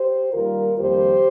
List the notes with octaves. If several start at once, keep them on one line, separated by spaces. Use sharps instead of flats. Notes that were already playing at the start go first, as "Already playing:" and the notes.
Already playing: G4 C5
D#2 D#3 G3 A#3 F4 A#4
F2 D#3 G3 A#3 G4 C5